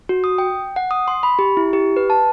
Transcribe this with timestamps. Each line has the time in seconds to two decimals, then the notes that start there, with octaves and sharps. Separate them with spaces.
0.09 F#4
0.24 D#6
0.38 G5
0.76 F#5
0.91 D#6
1.08 C6
1.23 B5
1.39 G4
1.57 E4
1.73 G4
1.96 B4
2.10 A5